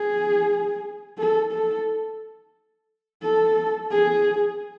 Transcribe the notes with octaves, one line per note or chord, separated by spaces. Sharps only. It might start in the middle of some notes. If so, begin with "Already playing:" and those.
Already playing: G#4
A4
A4
A4
G#4